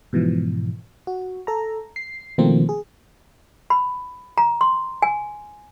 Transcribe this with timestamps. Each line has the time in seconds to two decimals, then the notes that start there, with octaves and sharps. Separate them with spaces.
0.13 G#2 B2 E3 F3
1.07 F#4
1.47 A4 A#5
1.96 C7
2.38 B2 D#3 F3 A3 A#3 C4
2.69 G#4
3.70 B5
4.38 A#5
4.61 C6
5.02 G#5